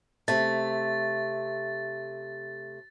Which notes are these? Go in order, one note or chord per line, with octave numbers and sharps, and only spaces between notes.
C3 A3 A6